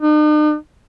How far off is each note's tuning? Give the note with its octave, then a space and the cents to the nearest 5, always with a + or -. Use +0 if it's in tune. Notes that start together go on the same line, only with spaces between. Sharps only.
D#4 -45